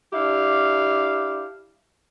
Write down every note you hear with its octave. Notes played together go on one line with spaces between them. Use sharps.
D4 E4 G4 F5